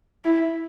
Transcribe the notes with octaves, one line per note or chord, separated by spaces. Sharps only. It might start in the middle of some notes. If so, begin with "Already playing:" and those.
E4